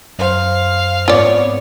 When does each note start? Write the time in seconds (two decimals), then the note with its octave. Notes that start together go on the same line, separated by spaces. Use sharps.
0.19 F#2 C5 F5
1.08 G#2 B3 C4 F4 C#5 D5